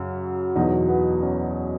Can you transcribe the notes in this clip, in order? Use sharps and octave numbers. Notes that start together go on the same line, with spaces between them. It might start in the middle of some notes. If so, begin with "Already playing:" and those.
Already playing: F#2 C#3 F#3
E2 B2 F#3 D#4
B3
C#4